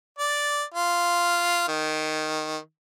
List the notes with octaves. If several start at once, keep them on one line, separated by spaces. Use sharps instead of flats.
D5
F4
D#3